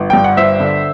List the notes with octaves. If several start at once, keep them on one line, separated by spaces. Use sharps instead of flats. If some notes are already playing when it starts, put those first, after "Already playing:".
Already playing: G1
G2 G5
F#5
G1 C5 E5
D3